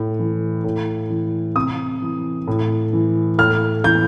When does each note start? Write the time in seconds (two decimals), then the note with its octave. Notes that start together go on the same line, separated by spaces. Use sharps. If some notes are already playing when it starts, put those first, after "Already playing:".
Already playing: A2
0.19 E3
0.64 A2
1.10 E3
1.56 C3 D#6
2.02 E3
2.47 A2
2.93 E3
3.38 A2 F6
3.84 E3 G6